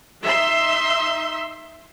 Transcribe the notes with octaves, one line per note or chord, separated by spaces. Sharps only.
D#4 E5 C6